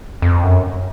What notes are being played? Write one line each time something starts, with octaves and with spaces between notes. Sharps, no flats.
F2
F#2